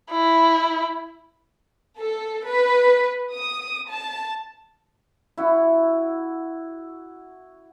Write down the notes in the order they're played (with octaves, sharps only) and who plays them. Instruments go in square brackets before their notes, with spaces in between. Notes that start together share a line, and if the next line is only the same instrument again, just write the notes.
[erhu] E4
[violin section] A4
B4
D#6
A5
[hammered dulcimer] E4 F#4